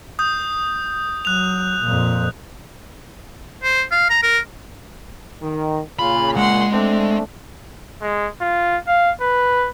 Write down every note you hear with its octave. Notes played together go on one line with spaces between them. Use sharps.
D#6 G6
F#3 F#6 F7
F2 A#2
C5
F5
A#5
A#4
D#3
A#2 C#3 F4 B5
G#3 F#5 C6
A3 C4 D4
G#3
F4
F5
B4